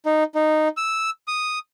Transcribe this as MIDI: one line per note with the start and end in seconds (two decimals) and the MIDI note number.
0.06 0.24 63
0.35 0.68 63
0.77 1.10 88
1.28 1.59 87